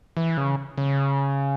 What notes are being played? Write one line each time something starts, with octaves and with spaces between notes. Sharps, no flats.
E3
C#3
C#3